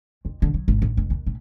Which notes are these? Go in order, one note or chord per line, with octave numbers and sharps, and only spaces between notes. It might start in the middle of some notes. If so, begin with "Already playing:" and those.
F2
D3
F#3
G#1
A1
F1
D#2
A2